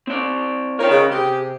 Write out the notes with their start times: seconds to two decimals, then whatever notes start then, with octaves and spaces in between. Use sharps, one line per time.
0.07 C4 D5
0.79 D#4 F4 A#4 C#5 G5
0.91 C#3 G#3
1.11 C3 G4 G#4